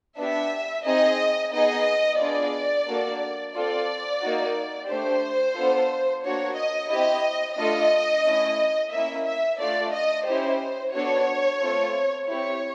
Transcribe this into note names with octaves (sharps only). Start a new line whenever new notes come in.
B3 D4 G4 E5
C4 D#4 G#4 D#5
B3 D#4 G#4 D#5
B3 D4 F4 G#4 D5
A#3 D4 F#4 A4
C4 F4 A4 D5
A#3 D#4 F#4
A3 D4 G4 C5
B3 D4 F4 A4
A#3 D4 F#4 C#5
D#5
C4 E4 G4 D#5
A3 D4 F4 A4 D#5
A3 C#4 E4
A#3 C#4 E4 E5
E5
A3 D4 F4 D5
D#5
C#4 E4 G4 C5
B3 D4 F#4 A4 C#5
A3 C4 F4 A4
C4 E4 G4 C#5